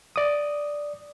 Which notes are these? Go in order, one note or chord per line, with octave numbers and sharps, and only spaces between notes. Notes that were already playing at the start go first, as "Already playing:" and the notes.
D5 D#6